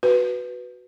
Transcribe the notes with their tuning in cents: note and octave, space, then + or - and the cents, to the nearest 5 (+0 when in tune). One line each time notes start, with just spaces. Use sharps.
F#4 +0 B4 +0